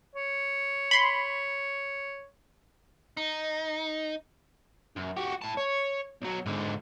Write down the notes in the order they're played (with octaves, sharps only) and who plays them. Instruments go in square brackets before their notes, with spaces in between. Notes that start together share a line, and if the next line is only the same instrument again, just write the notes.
[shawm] C#5
[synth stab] B5 C6
[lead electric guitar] D#4
[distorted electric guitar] F#2
F#4 G4
A2 A5
C#5
B1 F#3
G#2 D3